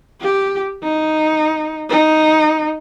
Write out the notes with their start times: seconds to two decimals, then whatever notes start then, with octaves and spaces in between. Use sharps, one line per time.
0.22 G4
0.84 D#4
1.90 D#4